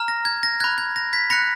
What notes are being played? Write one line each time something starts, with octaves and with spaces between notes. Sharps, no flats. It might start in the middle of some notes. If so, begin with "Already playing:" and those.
Already playing: A#5 F6
A#6
G#6
A#6
B5 F#6 G#6
G#6
A#6
G#6 B6
B5 F#6 A#6 C#7